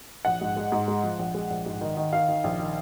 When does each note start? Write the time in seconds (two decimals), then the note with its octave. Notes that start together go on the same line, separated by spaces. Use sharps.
0.25 A#1 F#5
0.41 G#2
0.57 G#3
0.72 G#2
0.88 G#3
1.03 F3
1.19 A#1
1.34 G#3
1.50 A#1
1.66 G#2
1.81 D#3
1.97 D#3
2.13 D#3 F5
2.28 D#3
2.44 A#1
2.59 D#3